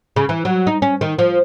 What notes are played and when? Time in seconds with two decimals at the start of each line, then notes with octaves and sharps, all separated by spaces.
0.16 C#3
0.29 E3
0.45 F#3
0.67 D#4
0.82 C#4
1.01 D#3
1.19 F3